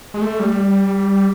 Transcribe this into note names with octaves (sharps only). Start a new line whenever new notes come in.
G#3
A3
G3